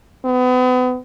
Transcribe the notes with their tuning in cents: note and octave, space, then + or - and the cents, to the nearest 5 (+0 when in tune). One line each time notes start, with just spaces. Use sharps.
B3 +35